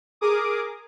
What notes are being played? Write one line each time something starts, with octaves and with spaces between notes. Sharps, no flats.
G#4 A#4 D6 D#6